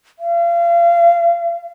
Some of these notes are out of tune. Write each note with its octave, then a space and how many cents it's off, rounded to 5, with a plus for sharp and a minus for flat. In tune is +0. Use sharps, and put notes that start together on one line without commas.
F5 -35